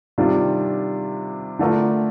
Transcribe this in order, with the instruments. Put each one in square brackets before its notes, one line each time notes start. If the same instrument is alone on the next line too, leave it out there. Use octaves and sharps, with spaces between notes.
[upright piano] C3 D#3 G3 D4 F4
D3 A3 D4 F4 A#4